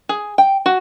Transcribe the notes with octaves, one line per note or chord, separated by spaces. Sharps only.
G#4
G5
F#4